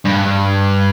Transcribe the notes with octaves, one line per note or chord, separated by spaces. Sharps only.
G2